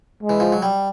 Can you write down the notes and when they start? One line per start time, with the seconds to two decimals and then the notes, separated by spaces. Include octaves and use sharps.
0.23 G#3
0.29 E3
0.40 F3
0.52 F#3
0.62 G3